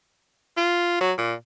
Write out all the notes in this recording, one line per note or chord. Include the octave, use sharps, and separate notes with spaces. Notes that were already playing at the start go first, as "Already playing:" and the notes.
F4
F#3
A#2